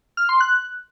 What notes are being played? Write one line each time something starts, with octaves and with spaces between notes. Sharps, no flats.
F6
C6
F#6